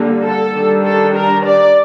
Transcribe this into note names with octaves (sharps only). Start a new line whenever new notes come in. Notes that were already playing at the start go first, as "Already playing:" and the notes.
Already playing: D3 G3 A#3
A4
D#3 G3 D4
A4
A#4
D5